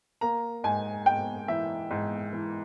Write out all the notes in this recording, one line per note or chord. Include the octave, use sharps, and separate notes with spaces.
A#3 A#5
G#2 G#5
G#2 G5
E3 E5
G#2
E3